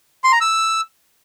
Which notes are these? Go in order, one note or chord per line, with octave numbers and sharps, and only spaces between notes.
C6
A#5
E6